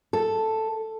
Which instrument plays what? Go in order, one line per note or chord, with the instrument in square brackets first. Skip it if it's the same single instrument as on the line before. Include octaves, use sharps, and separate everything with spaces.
[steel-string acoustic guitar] A4